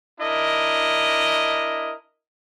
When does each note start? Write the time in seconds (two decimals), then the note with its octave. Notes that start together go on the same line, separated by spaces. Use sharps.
0.19 D4 E4 A#4 D#5